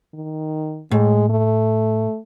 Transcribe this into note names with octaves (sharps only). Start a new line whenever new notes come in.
D#3
A2 G#3
A3